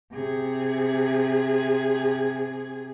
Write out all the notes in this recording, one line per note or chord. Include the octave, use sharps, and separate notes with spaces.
C3 G#4